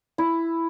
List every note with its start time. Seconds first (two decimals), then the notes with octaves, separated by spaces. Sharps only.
0.18 E4